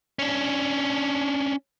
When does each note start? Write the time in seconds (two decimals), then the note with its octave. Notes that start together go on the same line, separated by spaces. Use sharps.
0.19 C#4 D4